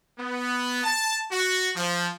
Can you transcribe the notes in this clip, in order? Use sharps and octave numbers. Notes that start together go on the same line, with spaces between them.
B3
A5
F#4
F3